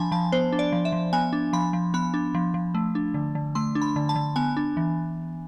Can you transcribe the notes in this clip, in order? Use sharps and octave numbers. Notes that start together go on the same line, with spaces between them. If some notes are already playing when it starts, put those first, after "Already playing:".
Already playing: F3 D4 G#5 A5 B5
F3 A5
B3 C5
D4
D5
F3
E5
F3
B3 G#5
D4
F3 B5
F3
B3 B5
D4
F3
F3
A3
D4
D3
D3
A3 C6
D4
B5
D3
A5
D3
B3 G#5
D4
E3